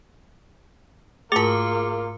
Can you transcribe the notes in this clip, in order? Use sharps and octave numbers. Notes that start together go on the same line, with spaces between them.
G#2 A3 A#3 F4 G#4 A#4 D6